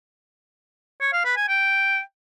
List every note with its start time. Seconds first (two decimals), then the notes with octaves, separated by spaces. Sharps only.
1.01 C#5
1.13 F5
1.25 B4
1.37 G#5
1.48 G5